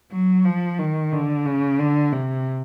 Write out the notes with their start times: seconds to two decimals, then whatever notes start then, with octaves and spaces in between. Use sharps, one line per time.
0.12 F#3
0.45 F3
0.79 D#3
1.13 D3
1.46 C#3
1.79 D3
2.13 C3